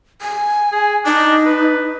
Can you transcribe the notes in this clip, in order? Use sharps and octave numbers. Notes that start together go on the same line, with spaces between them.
G#5
G#4
D4 D#4
B4